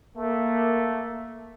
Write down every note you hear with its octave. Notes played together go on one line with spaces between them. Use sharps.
A3 A#3